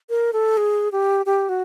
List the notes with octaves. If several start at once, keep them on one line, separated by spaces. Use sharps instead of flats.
A#4
A4
G#4
G4
G4
F#4